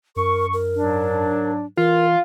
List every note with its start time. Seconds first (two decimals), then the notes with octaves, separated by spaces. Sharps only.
0.16 F#2 A#4 C#6
0.53 A#4
0.75 G#2 F#3 D4
1.77 E3 F4 A#4